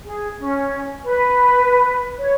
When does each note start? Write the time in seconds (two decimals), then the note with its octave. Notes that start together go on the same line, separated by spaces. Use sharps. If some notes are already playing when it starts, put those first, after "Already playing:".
0.05 G#4
0.40 C#4
1.05 B4
2.18 C#5